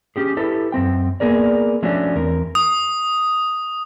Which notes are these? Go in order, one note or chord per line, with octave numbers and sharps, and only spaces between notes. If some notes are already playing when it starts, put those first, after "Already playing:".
C#4 G4 G#4
E4 G4 A4 B4
F#2 A#3 C4 G5
A#3 B3 G#4 A#4 D5
F3 A3 C#4 D4 F#4
E2 C4 A#4
D#6